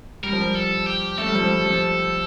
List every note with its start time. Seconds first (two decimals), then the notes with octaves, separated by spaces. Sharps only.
0.23 G3 A#4
0.32 F3
0.40 G3
0.55 A4
0.86 G4
1.18 A3 A4
1.27 G3
1.35 F3
1.44 G3
1.65 F3